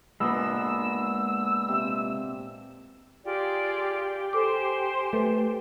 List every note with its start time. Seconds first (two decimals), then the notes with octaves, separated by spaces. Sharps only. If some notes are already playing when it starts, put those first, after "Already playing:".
0.20 A#2 G#3 B3 D4 E6
1.68 C3 F5
3.24 F4 G4 G#4 D5
4.33 A4 C5 G#5 C6 D6
5.13 A3 B4